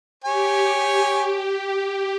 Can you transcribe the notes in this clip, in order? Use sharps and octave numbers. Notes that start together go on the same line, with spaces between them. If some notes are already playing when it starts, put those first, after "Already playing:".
G4 C#5 G#5